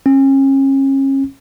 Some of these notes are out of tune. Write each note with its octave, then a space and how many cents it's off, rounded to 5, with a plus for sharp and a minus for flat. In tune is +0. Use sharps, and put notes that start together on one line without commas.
C#4 -35